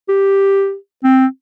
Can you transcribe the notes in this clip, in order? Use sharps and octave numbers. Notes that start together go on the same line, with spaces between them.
G4
C4